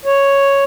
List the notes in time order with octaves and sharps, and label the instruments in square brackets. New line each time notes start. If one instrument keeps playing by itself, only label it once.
[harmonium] C#5